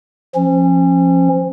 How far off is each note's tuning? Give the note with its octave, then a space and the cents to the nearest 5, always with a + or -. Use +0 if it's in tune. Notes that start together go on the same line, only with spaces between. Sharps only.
F3 -10 C#4 -35